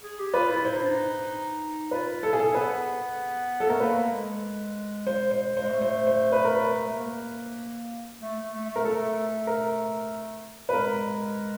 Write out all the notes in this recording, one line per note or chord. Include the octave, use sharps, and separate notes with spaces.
G#4
G4
F4 B4
E4
E4 C5
D#4
D4
D#4
F4 B4
E4 A4
G#4
A4
B3 B4
A4
A3 A#4
A#3 B4
G#3
C5
C5
G#3 C5
A3
C5
C5
B4
A#4
B4
A3
A#3
A3
A3
A3
A#4
A3 A4
A#4
B4
G#3 A#4